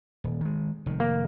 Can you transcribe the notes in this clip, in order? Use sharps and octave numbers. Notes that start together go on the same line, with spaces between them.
D#1
D#3 G#3
F1 D#3
A#3